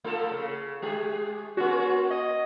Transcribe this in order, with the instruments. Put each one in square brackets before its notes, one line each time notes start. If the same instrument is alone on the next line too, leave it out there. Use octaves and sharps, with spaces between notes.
[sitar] A3 F4 A4
C#3
G#3 G4 G#4
[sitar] A#3 C#4 [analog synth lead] F#4
[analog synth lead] D#5